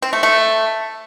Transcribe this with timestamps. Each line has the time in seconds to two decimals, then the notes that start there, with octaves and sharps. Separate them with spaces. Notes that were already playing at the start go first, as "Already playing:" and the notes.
0.02 C4
0.13 A3
0.23 A3